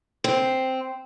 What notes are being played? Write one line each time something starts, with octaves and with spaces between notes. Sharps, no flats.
C4